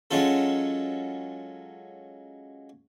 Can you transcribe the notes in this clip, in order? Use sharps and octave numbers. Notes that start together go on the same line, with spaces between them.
F#3 G#3 C#4 F4 A4